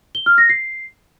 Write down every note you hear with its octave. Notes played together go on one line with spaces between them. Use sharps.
G7
F6
A#6
C7